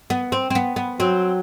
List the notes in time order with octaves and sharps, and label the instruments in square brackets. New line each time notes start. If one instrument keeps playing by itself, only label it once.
[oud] B3
C4
C4
B3
B3
[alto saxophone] F#3 [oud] C4